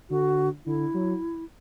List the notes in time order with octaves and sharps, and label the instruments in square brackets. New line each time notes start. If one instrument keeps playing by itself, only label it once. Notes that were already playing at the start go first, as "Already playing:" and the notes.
[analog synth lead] D3 [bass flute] F#4
[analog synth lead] D3 [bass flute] E4
[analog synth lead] F#3